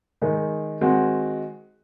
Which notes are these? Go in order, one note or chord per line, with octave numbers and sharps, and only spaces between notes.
D#3 G#3 D#4
D#3 G#3 C4 F#4